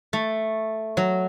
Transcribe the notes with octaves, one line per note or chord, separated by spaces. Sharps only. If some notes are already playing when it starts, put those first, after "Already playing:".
A3
F#3